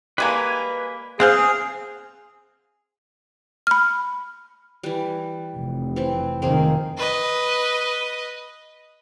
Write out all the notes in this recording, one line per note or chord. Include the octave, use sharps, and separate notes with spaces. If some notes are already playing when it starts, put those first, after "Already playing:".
G3 G#3 A#3 B4 G#5
C4 G#4 C5 F5 F#5 F6
B5 F6
E3 G3
F1
E3 C4
F1 D#3 A#3 C4 G#4
B4 D#5